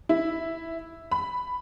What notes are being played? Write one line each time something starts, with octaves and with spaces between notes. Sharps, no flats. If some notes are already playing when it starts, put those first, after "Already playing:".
E4
B5